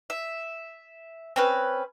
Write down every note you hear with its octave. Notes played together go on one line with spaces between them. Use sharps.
E5
C4 C#4 B4